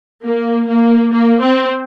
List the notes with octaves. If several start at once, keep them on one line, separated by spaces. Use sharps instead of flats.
A#3
A#3
A#3
C4